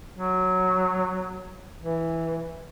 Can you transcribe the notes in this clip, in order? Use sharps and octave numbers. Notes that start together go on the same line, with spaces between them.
F#3
E3